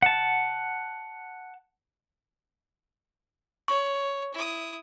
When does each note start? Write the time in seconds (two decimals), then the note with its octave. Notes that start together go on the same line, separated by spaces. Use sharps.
0.02 F#5 A5
3.68 C#5 C#6
4.34 E4 D#6